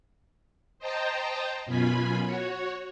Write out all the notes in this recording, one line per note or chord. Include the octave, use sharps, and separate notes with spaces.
C5 D#5 G5 A5 A#5
F#2 B2 F4 G#5 B5
F#4 C#5